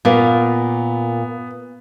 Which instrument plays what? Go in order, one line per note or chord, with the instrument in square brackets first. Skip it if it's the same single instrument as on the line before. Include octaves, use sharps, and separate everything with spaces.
[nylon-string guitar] A#2 A#3 [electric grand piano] B3